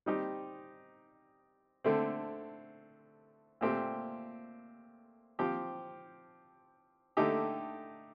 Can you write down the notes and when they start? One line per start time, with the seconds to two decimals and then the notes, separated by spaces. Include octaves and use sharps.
0.06 G3 C4 D#4 G4
1.84 D3 A3 C4
3.61 A#2 A3 C4 G4
5.39 F3 C4 G4
7.17 D3 A3 D#4 G4